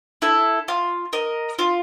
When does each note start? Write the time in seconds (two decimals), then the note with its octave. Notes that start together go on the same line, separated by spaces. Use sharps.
0.22 E4 A4
0.68 F4
1.13 A#4 D#5
1.59 F4